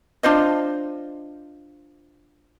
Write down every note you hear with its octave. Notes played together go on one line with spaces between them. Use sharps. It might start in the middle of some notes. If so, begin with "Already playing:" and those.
D4 F4 C5 D#5